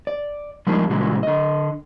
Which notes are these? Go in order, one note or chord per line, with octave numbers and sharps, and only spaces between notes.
D5
F3 G3 G#3 A#3 D4 D#4
A#2 C#3 E3 G3 G#3 F#4
D3 D#5